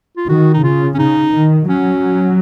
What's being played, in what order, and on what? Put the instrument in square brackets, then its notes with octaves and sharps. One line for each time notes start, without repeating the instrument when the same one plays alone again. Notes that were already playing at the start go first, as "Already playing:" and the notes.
[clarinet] F4
[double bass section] D#3 [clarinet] F#4
[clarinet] D#4
[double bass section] C#3 [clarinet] F4
[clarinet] C#4
[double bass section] C#3 [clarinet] D#4
[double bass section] D#3
[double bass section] F#3 [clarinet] C#4